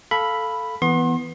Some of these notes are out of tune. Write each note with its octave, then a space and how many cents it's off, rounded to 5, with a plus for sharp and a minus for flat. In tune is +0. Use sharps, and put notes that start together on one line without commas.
A4 +0 F5 +0 B5 +0
E3 +0 B3 +0 C6 +35